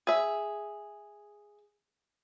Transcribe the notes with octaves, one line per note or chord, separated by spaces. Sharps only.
G#4 E5